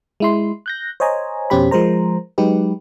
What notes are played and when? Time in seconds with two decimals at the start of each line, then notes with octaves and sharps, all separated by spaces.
0.20 G#3 E4 C6
0.66 F#6 G6 A#6
1.00 C5 C#5 D#5 G#5 A#5
1.50 F2 B2 C#4 G4 C5 B5
1.71 F3 G#3 A#4 C5 A#5
2.38 F#3 G#3 D#4 G4 B4